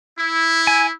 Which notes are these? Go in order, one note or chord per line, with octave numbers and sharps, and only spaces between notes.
E4
G#5